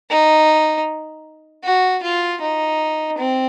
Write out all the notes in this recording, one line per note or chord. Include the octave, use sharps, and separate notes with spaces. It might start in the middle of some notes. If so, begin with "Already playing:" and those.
D#4
F#4
F4
D#4
C4